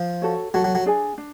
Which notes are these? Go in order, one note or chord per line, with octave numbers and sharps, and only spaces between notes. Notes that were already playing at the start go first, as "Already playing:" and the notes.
Already playing: F3
F#4 A4 C#5
F#3 F#4 A4 C#5
F#3
F#3
D4 G#4 D5 G#5
D4